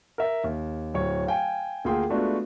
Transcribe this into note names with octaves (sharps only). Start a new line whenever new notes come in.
A#4 E5
D#2
D1 C#5
F5 G5 G#5
D2 A#3 F4 G#4 G5 C6
G#3 A3 B3 D4 F4 F#4